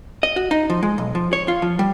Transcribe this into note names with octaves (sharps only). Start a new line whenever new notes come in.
D#5
F#4
D#4
F3
G#3
B1
F3
C#5
F4
F3
G3